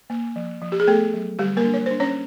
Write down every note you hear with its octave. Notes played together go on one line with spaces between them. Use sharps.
A#3
F3
F3
G4
G#4
A3 B3 A4
F#3
D3 G3 G4
A#3 A#4
D4
C#5
D4 C5
C#4 C#5